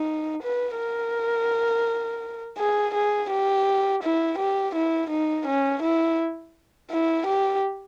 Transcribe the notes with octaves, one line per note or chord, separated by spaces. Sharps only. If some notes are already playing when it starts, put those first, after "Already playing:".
Already playing: D#4
B4
A#4
G#4
G#4
G4
E4
G4
E4
D#4
C#4
E4
E4
G4